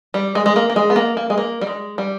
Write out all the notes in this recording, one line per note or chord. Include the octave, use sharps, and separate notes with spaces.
G3
G#3
G#3
A#3
A#3
G#3
B3
A#3
A#3
G#3
A#3
G3
G#3
G3